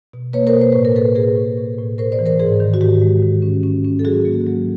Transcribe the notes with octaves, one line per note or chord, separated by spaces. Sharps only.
B2
A#3 B4 C#5
A#4 C5
B2
C5
A2 B4
A#4
A2 A4 B4
A2 G#4 A#4
A2
A2
A2
A2 A#4 C5
C5 D5
E3
A#4 C5
G#2 G#4 A#4
D#3
F#4
G#2 G4
G#3
D#3
C#4
C#4
C#4
A4
F#3 F#4 G#4
A#3
F#3